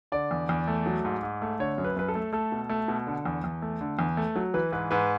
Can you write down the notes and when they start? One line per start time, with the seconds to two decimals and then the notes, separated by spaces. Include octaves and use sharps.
0.12 D3 D5
0.31 E2
0.49 E2
0.68 A3
0.86 F#3
1.05 G#2
1.23 G#2
1.42 A3
1.59 D3 C#5
1.78 F#2
1.84 B4
1.96 F#2 B4
2.08 A4
2.15 A3
2.33 A3 A4
2.52 B2
2.69 A3
2.88 B2
3.07 D3
3.25 E2
3.44 E2
3.62 A3
3.81 D3
3.99 E2
4.17 A3
4.36 F#3
4.54 E3 B4
4.72 G#2 B4
4.91 G#2 B4